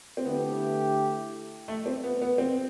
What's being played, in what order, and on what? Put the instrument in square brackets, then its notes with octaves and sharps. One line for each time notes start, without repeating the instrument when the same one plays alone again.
[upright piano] C4
[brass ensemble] D3 A3 E4 G4 [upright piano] B3
[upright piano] A3
C4
B3
B3
C4